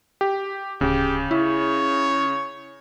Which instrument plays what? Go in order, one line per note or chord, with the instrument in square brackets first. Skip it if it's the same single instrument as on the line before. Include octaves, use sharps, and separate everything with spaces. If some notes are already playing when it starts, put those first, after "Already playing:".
[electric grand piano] G4
[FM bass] D1 [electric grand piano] C#3 [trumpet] G4
[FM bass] E4 [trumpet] C#5